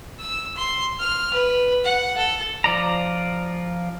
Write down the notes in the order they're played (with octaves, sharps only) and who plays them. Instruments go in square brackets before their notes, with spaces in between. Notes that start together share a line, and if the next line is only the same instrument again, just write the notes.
[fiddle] E6
C6
F6
B4
F#5
A4
[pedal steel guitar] F3 D5 A#5